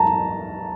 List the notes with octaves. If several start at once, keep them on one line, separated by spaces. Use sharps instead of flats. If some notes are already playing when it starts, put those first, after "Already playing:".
Already playing: A5 A#5